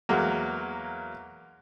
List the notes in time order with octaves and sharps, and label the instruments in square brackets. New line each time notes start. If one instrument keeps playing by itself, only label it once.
[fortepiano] E2 F#3 G#3 A#3